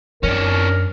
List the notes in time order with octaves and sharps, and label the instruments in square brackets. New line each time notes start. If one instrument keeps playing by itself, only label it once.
[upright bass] F#2 [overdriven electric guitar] C#4 D4 [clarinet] A#4